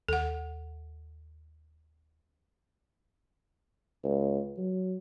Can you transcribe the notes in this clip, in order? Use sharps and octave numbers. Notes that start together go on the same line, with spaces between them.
D#2 A4 F#5
C#2
F#3